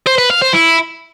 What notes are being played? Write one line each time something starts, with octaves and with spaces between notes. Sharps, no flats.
C5
B4
F5
C5
E4